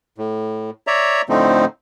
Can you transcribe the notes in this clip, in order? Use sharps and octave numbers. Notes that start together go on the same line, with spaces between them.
A2
C#5 D5 E5 A#5
A2 D3 F3 A3 C4 D#4